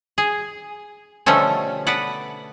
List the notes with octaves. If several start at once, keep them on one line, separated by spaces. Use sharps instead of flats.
G#4
B2 D3 F3 G3 A3 C#4
B3 B4 D5 F#5